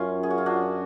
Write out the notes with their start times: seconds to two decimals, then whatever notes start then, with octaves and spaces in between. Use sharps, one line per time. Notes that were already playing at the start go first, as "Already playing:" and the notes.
Already playing: F#2 C#4 F4
0.23 G#4
0.30 F#4
0.38 F4
0.46 D4 F#4